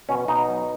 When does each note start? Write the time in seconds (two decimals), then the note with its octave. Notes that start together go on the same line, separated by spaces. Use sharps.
0.09 B2 C#4
0.28 B2 D#4
0.48 F#3